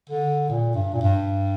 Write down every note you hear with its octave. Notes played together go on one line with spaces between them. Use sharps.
D3
A#2
G2
A#2
G2